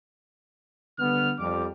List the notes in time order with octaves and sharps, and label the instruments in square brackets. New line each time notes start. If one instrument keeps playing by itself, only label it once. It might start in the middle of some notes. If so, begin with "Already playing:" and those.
[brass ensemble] D3 G3 B3 [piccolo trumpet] F6
[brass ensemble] F2 G3 [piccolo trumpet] D6